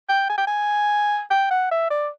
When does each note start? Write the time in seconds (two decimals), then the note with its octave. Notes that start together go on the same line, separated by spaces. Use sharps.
0.09 G5
0.29 G#5
0.38 G5
0.47 G#5
1.30 G5
1.51 F#5
1.71 E5
1.90 D5